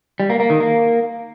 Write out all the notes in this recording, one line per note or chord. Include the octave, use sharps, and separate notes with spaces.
G3
A#3
A#3
D#3
A#3